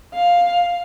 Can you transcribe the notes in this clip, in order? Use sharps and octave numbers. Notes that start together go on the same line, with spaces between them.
F5